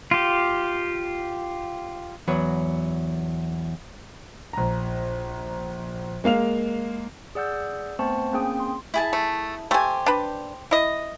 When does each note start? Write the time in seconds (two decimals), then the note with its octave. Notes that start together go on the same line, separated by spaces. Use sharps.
0.11 F4 G4
2.28 E2 F#3 B4
4.53 A#1 A#5
6.24 G#3 A#3 F5 F7
7.35 G#4 D5 F#5 E6 G6
7.99 A3 B3 C4 C5 A5 C#6
8.33 A#3 C4 C#4 G#4 G5 D#6
8.60 C6
8.94 E4 G#4 A5
9.13 A3
9.71 A3 G4 C5 G#5
10.06 D4 B4
10.71 E4 D#5